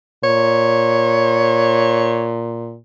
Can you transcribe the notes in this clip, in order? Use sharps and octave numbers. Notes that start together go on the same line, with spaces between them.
A#2 C#5